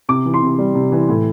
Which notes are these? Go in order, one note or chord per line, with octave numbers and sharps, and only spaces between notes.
C3 D6
E3
C6
C3
G3
C3
E3
A2